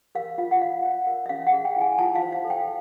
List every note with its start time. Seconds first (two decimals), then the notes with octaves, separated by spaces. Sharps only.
0.15 A#4 F5
0.38 F4 F5
0.51 F#5
0.61 F4 F5
0.85 C#5
1.07 A#4
1.26 E5
1.29 C#4 F5
1.47 F#5
1.52 G#4
1.65 G5
1.76 E4 G#5
1.98 F4 A5
2.15 F5
2.21 C5
2.32 F5
2.44 A4
2.50 G5